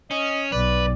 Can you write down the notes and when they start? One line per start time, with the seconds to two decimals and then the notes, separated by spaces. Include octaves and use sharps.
0.11 C#4 D#5
0.52 B1 B4 D5